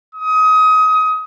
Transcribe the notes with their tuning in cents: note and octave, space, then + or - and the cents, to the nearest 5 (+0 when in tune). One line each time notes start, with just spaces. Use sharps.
D#6 +25